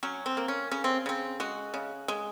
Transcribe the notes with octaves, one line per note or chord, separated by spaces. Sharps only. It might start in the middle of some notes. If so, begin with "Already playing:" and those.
F#3 C#4
C4
A#3
C#4
C#3 C#4
C4
C#3 C4
G#3 F#4
C#3
G#3